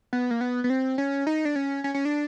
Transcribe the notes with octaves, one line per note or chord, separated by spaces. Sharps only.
B3
A#3
B3
B3
C4
C#4
D#4
D4
C#4
C#4
C#4
D4